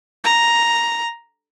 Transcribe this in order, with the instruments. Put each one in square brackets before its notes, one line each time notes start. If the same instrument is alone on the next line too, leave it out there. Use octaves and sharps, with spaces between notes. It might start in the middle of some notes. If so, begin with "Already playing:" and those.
[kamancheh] A#5